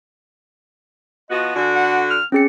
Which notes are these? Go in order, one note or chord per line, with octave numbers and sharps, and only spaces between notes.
F3 B3 F#4 D#5
D3 F#4 G#5
F#5
F6
C4 C#4 G#4 C#7